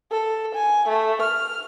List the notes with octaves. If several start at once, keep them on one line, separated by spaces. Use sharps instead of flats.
A4
G#5
A3
F6